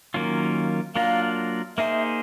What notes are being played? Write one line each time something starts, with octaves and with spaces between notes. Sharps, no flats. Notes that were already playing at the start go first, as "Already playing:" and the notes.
D#3 F#3 A#3 C#4 F4
F#3 A#3 D4 F4 A#4 F5
A#3 D#4 G#4 C5 E5